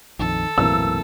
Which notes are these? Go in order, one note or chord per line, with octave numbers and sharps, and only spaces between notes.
A#1 F2 D#3 A4
B1 F#2 A2 C3 E3 A#3 E6